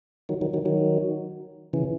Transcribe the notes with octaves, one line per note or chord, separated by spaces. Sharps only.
D#3 F#3
D#3 F#3
D#3 F#3
D#3 F#3
C#3 E3